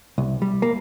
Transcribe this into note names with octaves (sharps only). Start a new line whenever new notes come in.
C2
G3
A#3